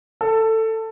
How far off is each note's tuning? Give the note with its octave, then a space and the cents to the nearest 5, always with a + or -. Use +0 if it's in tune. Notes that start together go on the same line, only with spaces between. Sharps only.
A4 +15